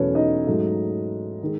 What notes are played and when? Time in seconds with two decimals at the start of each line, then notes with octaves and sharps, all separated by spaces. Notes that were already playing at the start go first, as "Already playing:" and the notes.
Already playing: E2 B2 F#3 A3 C#4 A4 B4 C#5
0.15 D#4 D#5
0.47 G#2 F#3 A3
1.43 D#3 G#3